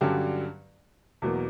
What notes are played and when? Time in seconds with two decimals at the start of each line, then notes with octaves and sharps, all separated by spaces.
0.01 G2 D3 F#3 C#4 G4
1.22 E2 B2 F#3 A#3